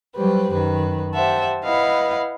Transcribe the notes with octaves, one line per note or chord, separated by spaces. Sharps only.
F#3 G3 G4 B4 C5
F#2 D#3 B4
G4 C5 E5 F#5 A5
E4 B4 D#5 F5 F#5